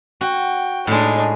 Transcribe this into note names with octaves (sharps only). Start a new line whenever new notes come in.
F#4 G5
A2 G#3 D4 D#4